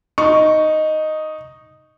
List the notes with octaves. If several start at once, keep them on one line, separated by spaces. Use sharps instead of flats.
D#4 C#6